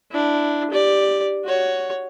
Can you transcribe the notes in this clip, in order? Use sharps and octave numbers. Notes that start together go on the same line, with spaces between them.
D4 E4
G4 D5
F#4 C#5